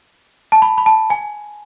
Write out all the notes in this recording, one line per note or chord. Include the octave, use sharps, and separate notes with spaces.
A5
B5
B5
A5
G#5